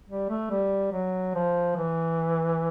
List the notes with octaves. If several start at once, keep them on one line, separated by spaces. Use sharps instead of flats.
G3
A3
G3
F#3
F3
E3